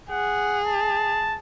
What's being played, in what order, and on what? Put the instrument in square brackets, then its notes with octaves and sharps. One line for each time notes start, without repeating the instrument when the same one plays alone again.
[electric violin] G#4 [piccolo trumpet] F#5
[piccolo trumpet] A5